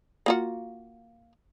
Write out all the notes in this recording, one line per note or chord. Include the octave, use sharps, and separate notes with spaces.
A#3 F4 F#4